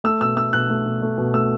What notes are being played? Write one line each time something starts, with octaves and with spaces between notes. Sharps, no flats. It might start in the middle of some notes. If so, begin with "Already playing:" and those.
A3 E6
B2 E6
A3 E6
B2 F#6
A3
B2
A3
B2
A3 E6